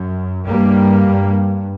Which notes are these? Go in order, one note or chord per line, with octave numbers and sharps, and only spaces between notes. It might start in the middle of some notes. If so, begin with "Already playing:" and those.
Already playing: F#2
G2 G3 A#3
G2